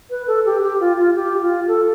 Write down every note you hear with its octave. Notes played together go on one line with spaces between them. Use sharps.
B4
A4
G4
G4
F4
F4
G4
F4
A4